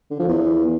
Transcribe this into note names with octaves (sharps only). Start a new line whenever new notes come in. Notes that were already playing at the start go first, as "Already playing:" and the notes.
D3
F3
E2